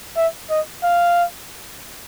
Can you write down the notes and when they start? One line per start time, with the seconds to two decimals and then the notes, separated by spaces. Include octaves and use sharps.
0.17 E5
0.50 D#5
0.84 F5